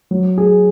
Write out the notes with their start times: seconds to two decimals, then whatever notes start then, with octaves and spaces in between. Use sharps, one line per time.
0.11 F#3
0.38 G#4